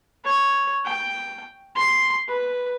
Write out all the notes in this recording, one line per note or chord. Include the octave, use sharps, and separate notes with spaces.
C#5
G5
C6
B4